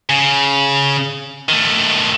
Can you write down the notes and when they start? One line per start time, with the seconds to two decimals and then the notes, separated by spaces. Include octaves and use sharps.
0.09 C#3
1.49 D#3 A3